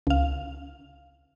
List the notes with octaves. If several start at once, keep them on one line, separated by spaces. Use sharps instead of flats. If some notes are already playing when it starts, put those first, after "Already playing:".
C#2 F5